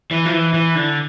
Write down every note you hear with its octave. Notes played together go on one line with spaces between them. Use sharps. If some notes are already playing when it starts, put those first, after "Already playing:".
E3
F3
E3
E3
D3